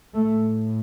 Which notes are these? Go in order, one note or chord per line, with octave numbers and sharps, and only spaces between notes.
A2 A3